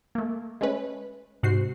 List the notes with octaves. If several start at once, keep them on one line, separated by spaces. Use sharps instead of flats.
A3 A#3
G#3 A3 C#4 B4
G#2 C3 F#4 C5 C7